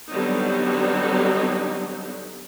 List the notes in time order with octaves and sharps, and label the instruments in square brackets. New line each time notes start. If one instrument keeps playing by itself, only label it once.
[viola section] D3 F#3 G3 B3 C4 D#4